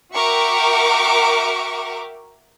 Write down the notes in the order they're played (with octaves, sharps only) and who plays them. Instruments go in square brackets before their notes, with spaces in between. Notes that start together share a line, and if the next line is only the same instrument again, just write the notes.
[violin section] F#4 A#4 E5 G5 C#6 D6